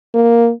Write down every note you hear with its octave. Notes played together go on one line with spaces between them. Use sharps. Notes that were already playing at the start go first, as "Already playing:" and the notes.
A#3